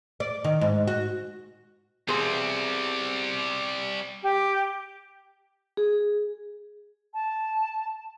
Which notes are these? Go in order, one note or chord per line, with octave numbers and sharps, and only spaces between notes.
D5
D#3
G#2
F#4
B2 G3 C4 G#4 C6
G4
G#4
A5